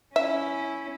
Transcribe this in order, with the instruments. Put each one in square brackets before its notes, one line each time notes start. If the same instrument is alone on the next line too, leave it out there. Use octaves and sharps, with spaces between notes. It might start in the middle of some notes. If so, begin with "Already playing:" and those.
[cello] C#4 E4 [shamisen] E5